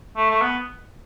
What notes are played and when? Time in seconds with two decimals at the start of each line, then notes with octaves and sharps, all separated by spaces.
0.16 A3
0.30 A3
0.42 B3